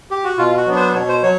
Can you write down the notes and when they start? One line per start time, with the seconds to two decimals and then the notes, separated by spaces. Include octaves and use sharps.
0.11 G4
0.24 F#4
0.38 B2 F4
0.57 F#4
0.67 F#3 B3 D4
0.76 C5
0.94 B2 C#5
1.09 C5
1.23 F#3 C#5